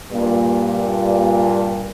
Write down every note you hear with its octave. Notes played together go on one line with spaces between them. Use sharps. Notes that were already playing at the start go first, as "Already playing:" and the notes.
G2 A#2